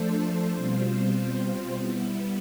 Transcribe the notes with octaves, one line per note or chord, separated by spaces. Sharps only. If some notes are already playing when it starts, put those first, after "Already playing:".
Already playing: F3 A3 D4 A4 C5
B2 G3 C4 F4 C5
G3 B3 E4